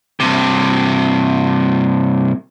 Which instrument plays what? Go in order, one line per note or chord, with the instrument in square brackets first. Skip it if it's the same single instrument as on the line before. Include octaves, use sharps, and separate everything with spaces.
[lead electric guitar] G2 C3